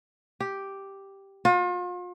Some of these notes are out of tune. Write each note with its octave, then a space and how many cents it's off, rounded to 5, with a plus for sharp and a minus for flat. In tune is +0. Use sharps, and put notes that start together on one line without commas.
G4 +0
F4 +40